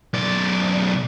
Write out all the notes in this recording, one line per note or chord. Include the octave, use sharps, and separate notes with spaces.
B1 D5